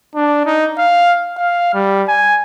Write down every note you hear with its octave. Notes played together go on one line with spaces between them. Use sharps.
D4
D#4
F5
F5
G3
G#5